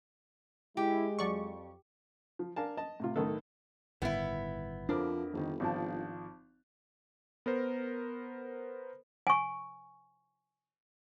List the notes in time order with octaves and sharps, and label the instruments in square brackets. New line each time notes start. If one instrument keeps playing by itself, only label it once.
[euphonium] G#3 [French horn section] E4 [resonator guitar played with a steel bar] G4
[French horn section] F2 [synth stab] F#3 D5 C#6
[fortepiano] F3
D4 A#4 F5 G#5 A5
D#5 A5
A2 C3 F4
B1 A2 D#3 A3 D#4 A4
[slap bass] G1 A2 D#3 [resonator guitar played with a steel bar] B3 E4
[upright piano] F2 A#4 D6 [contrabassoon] F3 [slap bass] D4
[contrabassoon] G1 [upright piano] F2 D#3
[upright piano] G#1 F3 A5
[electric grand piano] B3 A#4 C5
[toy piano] G#5 C#6